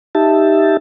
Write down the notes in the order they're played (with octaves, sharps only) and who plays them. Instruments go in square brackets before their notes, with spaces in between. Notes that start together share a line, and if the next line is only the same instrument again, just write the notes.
[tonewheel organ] D#4 G4 E5 A5